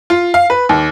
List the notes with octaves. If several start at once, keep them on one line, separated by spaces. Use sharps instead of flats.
F4
F5
B4
D#2